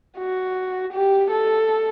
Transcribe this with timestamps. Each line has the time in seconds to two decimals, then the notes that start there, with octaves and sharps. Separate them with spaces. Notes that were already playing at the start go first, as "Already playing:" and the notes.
0.18 F#4
0.93 G4
1.31 A4